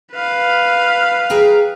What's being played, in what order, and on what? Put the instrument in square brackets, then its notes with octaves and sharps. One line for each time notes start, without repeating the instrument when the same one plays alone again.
[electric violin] B4 F5
[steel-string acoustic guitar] G#4 G5 A#5